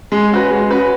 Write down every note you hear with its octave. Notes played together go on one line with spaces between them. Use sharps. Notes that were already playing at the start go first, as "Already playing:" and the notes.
G#3
C#4 F#4 B4
G#3
C#4 F#4 B4